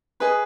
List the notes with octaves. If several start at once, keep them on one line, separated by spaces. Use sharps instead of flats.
G#4 B4 D#5